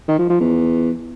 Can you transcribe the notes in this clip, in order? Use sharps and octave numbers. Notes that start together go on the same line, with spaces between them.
D#3
F3
F3
E2